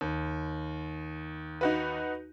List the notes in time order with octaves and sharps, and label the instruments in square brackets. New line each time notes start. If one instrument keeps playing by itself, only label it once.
[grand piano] D#2
[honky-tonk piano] D#4 F#4 B4